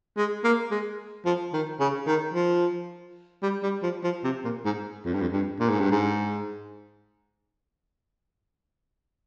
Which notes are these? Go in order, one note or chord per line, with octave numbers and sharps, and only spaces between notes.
G#3
A#3
G#3
F3
D#3
C#3
D#3
F3
G3
G3
F3
F3
C3
A#2
G#2
F2
G2
F2
G2
A#2
G#2
G2
G#2